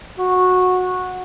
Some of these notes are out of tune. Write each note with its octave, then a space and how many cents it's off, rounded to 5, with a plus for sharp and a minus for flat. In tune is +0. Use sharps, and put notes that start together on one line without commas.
F#4 -15